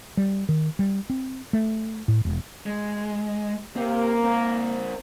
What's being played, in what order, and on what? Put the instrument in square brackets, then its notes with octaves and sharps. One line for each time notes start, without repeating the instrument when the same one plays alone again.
[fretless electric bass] G3
D#3
G3
C4
A3
A2
E1
[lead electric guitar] G#3
[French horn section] A#3 [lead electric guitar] C4 G4
[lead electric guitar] C4 A#4